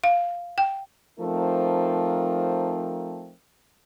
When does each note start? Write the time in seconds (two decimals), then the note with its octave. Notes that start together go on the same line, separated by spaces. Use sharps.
0.04 F5
0.58 G5
1.19 F3 A3 C4 D#4 A#4